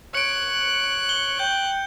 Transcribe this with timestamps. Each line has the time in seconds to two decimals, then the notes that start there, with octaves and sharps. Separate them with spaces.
0.15 C#5 F#6 C#7 D7
1.09 G7
1.39 G5 G6